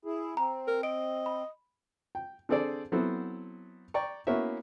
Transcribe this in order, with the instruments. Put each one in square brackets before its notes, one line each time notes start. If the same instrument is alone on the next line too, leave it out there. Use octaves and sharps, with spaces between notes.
[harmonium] E4 G#4
[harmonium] C4 [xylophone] A#5
[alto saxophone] A#4
[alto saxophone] D#5 [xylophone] D7
[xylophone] B5
[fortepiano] G5
D3 C4 G#4 A4 C5 D5
F#3 B3 C4 E4 A4 C5
D5 G5 A#5 C#6
A#3 B3 C#4 E4 F#4 E5